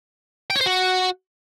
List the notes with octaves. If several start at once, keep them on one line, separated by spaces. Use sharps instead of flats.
G5
C#5
C5
F#4